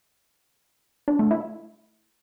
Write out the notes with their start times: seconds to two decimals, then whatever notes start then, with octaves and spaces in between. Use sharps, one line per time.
1.08 D4
1.19 A3
1.31 E4